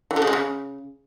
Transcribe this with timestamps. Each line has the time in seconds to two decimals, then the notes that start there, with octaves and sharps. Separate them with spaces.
0.11 E3
0.16 D3
0.22 C#3
0.27 G#3
0.33 C#3